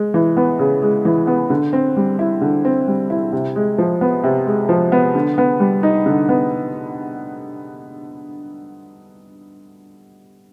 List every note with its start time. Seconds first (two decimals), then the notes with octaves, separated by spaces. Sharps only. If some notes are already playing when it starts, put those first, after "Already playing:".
Already playing: G#3
0.14 E3
0.37 B3
0.59 C#3
0.82 G#3
1.05 E3
1.27 B3
1.50 D3
1.73 C4
1.97 G3
2.19 E4
2.42 D3
2.65 C4
2.88 G3
3.10 E4
3.32 C3
3.55 G#3
3.78 F3
4.01 B3
4.24 C3
4.46 G#3
4.69 F3
4.92 B3
5.15 D3
5.38 B3
5.60 G3
5.83 D#4
6.06 D3
6.29 B3